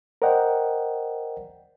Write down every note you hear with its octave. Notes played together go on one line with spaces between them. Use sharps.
A#4 C5 D5 D#5 F#5 G5